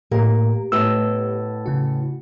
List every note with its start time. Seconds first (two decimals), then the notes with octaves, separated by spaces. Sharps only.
0.12 A2 A#3 G4
0.72 A2 B3 D#5 E6
1.66 C#3 F#4